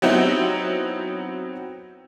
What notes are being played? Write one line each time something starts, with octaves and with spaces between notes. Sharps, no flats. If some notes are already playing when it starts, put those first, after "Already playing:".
F#3 B3 C4 D#4 E4 G4